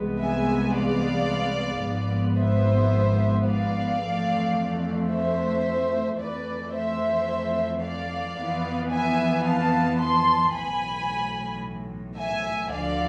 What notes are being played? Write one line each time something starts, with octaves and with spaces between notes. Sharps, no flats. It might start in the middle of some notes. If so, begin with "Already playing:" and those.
Already playing: C2 C3 E3 G#3 B3
E5 G#5
D5 F5
G#1 G#2 F3 B3
C5 E5
D5 F5
F2 E3 A3
C5 E5
F2 E3 A3 B4 D5
C5 E5
D5 F5
F2 E3 B3
E5 G#5
F5 A5
A5 C6
B1 A2 E3 G#5 B5
E5 G#5
D2 D3 F3 A3 D5 F5